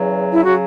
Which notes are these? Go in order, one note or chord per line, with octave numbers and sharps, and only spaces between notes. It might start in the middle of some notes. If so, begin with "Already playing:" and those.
Already playing: E2 C#3 F#3
E4
C#3 F#3 F#4